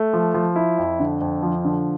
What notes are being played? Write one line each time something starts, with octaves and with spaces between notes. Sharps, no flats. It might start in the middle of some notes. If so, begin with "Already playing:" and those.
Already playing: A3
F3
F3
E4
F2
D3
F2
F3
D3